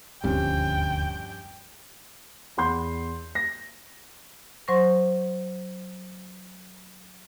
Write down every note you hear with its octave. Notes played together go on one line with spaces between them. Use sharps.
D#1 D2 G2 F3 G3 C4 C#4 G5
E2 F#5 B5 C6 G6
A#6
F#3 C5 C6 C#6 A#6